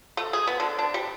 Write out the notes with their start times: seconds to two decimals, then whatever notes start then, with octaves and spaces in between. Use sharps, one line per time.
0.17 A3
0.33 G#4
0.47 B3
0.60 D3
0.79 D4
0.94 G3